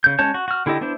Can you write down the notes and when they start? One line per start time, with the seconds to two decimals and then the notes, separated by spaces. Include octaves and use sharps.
0.04 C#3 G6
0.19 G#3 C#4 C#5 A5 G6
0.34 F#4
0.48 F#4 F6
0.66 D3 E4 G4 A4 D#5
0.81 B3 D4 E4 C5